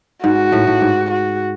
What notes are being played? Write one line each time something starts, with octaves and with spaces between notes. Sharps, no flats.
G#2 F#4
A2
A2
G#2
F#4